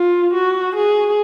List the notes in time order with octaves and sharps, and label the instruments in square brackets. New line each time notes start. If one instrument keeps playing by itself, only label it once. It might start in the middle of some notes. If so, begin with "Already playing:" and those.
Already playing: [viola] F4
F#4
G#4